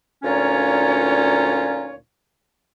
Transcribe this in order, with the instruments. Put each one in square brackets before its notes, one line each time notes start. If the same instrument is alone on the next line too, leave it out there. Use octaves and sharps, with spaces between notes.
[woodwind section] D2 A#2 C#4 D#4 F4 C#5